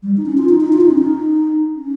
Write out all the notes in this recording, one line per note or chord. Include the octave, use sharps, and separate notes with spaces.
G3
D#4
C#4
F4
D#4
D#4
F4
D#4
C#4
D#4
C#4